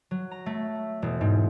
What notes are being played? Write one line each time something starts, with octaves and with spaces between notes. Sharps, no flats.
F#3
A#5
A3
E1
G#2